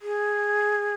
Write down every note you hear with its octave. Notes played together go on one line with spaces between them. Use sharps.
G#4